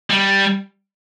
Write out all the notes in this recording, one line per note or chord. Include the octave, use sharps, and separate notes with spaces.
G3